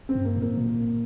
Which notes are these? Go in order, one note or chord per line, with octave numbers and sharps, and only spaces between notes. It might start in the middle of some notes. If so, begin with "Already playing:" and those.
C4
G2
A#3
A2
A#3
A#2